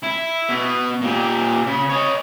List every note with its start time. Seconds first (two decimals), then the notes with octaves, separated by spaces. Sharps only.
0.03 E4
0.49 B2
1.01 A#2 G4
1.67 C#3
1.90 C#5 D#5